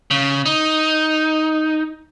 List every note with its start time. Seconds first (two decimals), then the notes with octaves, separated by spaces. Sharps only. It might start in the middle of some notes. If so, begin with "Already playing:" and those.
0.11 C#3
0.46 D#4